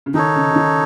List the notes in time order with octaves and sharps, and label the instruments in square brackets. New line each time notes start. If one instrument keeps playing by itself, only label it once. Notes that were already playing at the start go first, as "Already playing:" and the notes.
[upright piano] C#3
[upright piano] D#3 [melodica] D#4 A4 C#5
[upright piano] C#3
C#3
D#3